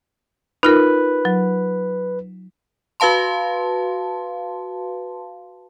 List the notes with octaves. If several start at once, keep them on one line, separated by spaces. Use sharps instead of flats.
D#4 F4 A#4 B4
F#3
F#4 B4 F5 A5 C6